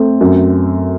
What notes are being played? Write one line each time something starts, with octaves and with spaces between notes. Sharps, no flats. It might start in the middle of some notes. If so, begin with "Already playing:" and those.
Already playing: A3 C4
F#2